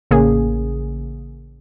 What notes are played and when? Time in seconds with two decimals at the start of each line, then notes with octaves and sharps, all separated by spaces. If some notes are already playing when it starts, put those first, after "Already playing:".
0.11 A1 C#3 A#3 G#4